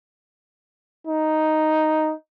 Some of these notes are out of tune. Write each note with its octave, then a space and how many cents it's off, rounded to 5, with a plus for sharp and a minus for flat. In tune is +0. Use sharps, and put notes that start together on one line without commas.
D#4 +0